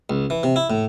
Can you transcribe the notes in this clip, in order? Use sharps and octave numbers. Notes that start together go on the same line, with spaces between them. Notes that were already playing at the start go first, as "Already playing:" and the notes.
C#2
E3
C3
E4
A2